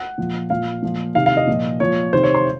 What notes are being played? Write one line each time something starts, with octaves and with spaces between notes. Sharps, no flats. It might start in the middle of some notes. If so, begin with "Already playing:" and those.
Already playing: F#5
A#2 F3
A#2 F3 F5
A#2 F3
C3 D#3 F5
F5
D#5
A#2 F3
A#2 F3 C#5
C3 D#3 C5
C#5
C6